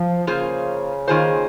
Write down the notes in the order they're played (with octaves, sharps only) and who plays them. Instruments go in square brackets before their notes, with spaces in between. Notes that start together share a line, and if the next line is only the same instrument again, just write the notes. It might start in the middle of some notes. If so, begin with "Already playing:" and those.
Already playing: [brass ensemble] F3
[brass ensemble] C#3 [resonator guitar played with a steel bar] A#3 F4 G#4 C5
[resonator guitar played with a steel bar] D#3 A#3 F4 G#4 C5